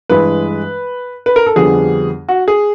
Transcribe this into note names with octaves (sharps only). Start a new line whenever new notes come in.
G2 E3 G#3 B4
B4
A#4
A4
F2 D3 G3 B3 G#4
F#4
G#4